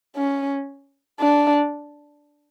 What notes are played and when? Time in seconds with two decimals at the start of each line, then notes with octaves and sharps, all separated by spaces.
0.16 C#4
1.20 D4